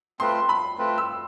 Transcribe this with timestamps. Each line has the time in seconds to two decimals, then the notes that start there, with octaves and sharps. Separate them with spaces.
0.20 A3 C4 F4 B4 C6
0.49 B5
0.78 A3 C4 F4 B4
0.98 E6